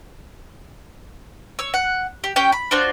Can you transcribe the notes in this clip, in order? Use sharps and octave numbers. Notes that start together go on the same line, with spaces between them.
C#5 E6
F#5
G4
C#4 G4 G5
B5
D4 F4 F#4 C5